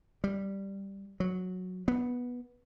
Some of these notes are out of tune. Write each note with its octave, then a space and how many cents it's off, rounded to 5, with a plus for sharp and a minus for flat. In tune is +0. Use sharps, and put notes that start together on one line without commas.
G3 +0
F#3 -10
B3 -10